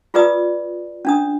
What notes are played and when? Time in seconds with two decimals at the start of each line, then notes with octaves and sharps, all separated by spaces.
0.14 F4 G#4 B4 D5 D#6
1.05 C#4 D4 D#6